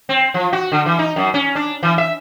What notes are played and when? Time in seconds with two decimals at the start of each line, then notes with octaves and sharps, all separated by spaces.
0.09 C4
0.34 F3
0.53 F#4
0.72 D3
0.86 E3
0.99 D#4
1.16 F#2
1.34 C#4
1.55 D4
1.83 E3
1.98 E5